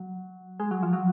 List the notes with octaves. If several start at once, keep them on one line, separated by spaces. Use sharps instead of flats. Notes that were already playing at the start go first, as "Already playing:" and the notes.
Already playing: F#3
G#3
F#3
F3
F#3